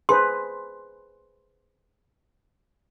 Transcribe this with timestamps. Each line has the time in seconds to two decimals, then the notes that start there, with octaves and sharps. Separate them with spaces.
0.09 G#4 B4 C5 C6